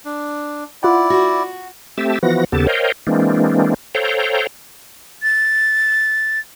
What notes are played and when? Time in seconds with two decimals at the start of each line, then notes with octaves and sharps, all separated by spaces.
0.05 D4
0.83 E4 F4 D5 F#5
1.10 F#4
1.98 A3 C4 G4 E5 A5
2.23 E3 F3 B3 F#4 A#6
2.52 D#2 C#3 B3 G4 A4 A5
2.67 A#4 C5 C#5 D#5 F5 G5
3.07 E3 G#3 A#3 C4 D4
3.95 A4 C5 C#5 F5 G5 A#5
5.23 A6